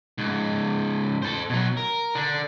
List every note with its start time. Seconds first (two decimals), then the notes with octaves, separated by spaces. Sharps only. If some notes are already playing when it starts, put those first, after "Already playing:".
0.18 C#2 G#2
1.22 A4 C5
1.50 B2 F#3
1.77 A#4
2.15 D3 D4